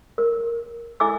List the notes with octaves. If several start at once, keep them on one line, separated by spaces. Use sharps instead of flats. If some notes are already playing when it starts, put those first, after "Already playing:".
A#4
E4 A4 E5 G#5 D6 E6